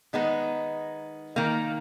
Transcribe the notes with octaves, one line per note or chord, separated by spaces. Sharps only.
D#3 G#3 B3 D#4
D#3 A#3